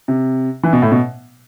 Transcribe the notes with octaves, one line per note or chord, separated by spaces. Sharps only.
C3
E3
B2
A2
B2